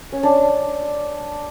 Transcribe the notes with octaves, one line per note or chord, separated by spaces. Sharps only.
C#4
D4